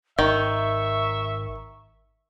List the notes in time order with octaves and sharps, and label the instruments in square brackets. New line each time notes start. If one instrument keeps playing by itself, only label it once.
[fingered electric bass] G#1 [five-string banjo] D#3 [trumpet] E5 [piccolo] C#6